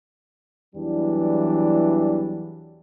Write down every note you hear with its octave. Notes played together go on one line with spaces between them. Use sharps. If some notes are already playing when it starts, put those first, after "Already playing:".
E2 E3 F#3 G3 D4